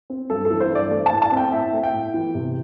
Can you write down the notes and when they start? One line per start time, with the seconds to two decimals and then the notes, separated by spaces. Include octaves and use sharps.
0.10 C4
0.30 G2 A4
0.45 A4
0.50 E3
0.60 C5
0.71 G2 D5
0.91 A3
1.06 A5
1.12 A2
1.22 A5
1.32 C4 G5
1.52 A2 E5
1.73 A3
1.83 G5
1.93 A2
2.14 E3
2.35 C3